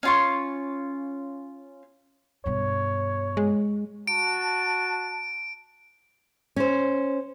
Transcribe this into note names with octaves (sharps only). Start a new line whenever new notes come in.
C#4 F4 C#6
G2 B2 C#5
G#3
F#4 A5 D7
C#4 C5